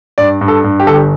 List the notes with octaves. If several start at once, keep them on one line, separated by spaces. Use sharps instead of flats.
G2 D5
G2
A4
G2
G4
G1 A4
G4